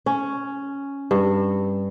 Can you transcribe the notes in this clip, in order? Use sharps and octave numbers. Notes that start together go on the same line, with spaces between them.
C#4
G2